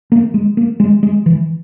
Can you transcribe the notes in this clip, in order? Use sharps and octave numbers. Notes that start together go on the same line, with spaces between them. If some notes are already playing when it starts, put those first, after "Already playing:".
A#3
G#3
A#3
G#3
G#3
E3